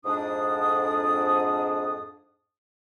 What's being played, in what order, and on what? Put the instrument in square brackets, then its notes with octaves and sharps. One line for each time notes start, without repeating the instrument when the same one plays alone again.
[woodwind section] F2 G#2 D4 D#6